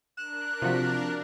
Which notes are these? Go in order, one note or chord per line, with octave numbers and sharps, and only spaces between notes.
D4 A#4 F#6 E7
C3 F3 F4 F#4 B6